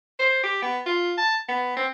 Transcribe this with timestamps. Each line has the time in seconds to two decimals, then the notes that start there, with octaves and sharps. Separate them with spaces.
0.19 C5
0.44 G4
0.62 B3
0.86 F4
1.17 A5
1.48 B3
1.77 C4